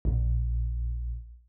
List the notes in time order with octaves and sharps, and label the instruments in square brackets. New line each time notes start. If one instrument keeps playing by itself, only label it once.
[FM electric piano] A#1